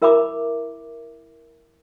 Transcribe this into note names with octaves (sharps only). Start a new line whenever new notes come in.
E4 A#4 E5 A#5 B5 D6